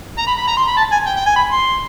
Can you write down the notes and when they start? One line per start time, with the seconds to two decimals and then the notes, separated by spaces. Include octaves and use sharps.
0.18 A#5
0.27 B5
0.38 B5
0.48 A#5
0.57 C6
0.68 B5
0.77 A5
0.92 G#5
1.07 G5
1.17 G5
1.26 G#5
1.36 B5
1.52 C6